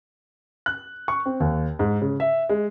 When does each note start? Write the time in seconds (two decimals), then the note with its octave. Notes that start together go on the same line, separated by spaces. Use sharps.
0.66 F#6
1.08 C#6
1.26 C4
1.40 D#2
1.79 G#2
2.01 C#3
2.20 E5
2.49 G#3